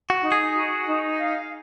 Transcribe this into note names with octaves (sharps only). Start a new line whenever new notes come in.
F#4
D#4
G#4
F#4
D#4
F5